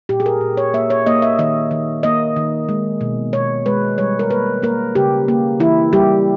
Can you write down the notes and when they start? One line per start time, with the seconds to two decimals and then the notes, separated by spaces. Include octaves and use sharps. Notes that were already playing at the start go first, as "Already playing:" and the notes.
0.09 A#2 G4
0.20 G#4
0.26 A#4
0.41 A#2
0.57 C#5
0.74 A#3 E5
0.90 C#5
1.06 A#3 D#5
1.22 E5
1.39 D#3 D#5
1.71 D#3
2.03 A#3 D#5
2.36 D#3
2.69 G#3
3.01 B2
3.33 B2 C#5
3.66 G#3 B4
3.98 G3 C#5
4.19 A#4
4.30 A#3 B4
4.63 A#3 A#4
4.95 C#3 G4
5.28 A#3
5.60 E3 E4
5.93 G3 G4